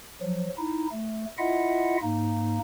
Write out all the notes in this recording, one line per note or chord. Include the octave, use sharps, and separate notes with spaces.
F3 F#3
D#4 E4
A3
E4 F4 D#5 E5 F#5
G#2 A#3 D#4